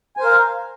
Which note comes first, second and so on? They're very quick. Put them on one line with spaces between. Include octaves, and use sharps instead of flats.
G#5 C5 A#4 F5